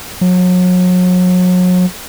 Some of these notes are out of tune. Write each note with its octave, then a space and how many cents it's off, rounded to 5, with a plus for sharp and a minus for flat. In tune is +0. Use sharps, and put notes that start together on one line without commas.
F#3 -35